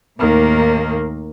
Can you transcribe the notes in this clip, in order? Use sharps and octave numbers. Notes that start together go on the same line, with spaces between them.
D#2 A2 D#3 A#3